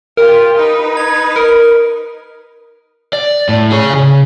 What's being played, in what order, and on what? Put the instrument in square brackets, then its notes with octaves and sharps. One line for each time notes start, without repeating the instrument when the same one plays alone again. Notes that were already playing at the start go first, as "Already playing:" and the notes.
[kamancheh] F4 G4 [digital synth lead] A#4
[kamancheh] D#4 B4
[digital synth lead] G#6
A#4
[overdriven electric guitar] D5
A2
G#4 C#5
C#3